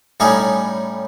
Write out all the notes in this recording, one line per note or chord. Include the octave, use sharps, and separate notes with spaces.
A2 G3 C#4 D#4 G#4